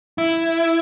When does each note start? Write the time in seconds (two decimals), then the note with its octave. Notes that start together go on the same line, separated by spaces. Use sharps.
0.18 E4